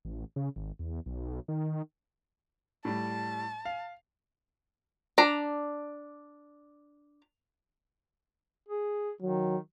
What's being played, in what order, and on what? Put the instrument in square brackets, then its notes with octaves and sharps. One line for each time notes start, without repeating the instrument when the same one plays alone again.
[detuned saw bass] A1
C#3
G#1
E2
B1
D#3
[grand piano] A2 G3 [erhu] A5
[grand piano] F5
[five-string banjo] D4 A#5
[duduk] G#4
[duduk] D#3 [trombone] F#3